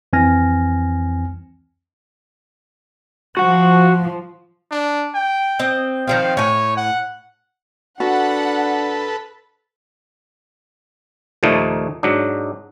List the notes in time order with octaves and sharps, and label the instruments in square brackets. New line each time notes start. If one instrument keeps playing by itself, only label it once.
[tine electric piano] F2 E3 C4 G#5 F6 A#6
[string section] F3 [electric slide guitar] F#4 F#5
[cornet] D4
G5
[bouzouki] C4 D#5
[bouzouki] D#3 F3 C4 [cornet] F5
[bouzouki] A2 G#5 [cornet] C#5
[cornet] F#5
[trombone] D4 [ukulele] F#4 [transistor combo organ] A4 B4 [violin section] F#5
[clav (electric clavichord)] D#2 A#2 F3 A3 A#3 D#4
G#2 F#3 D4